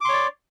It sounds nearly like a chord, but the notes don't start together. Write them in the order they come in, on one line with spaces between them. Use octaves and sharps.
D6 C6 C#5 D5